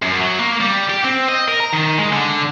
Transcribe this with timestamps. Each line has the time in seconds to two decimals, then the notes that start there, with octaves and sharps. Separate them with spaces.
0.02 F#2
0.20 F#3
0.39 A#3
0.61 G3
0.90 G4
1.05 C4
1.28 D#5
1.48 A#4
1.60 A#5
1.72 D#3
1.98 G#3
2.13 D3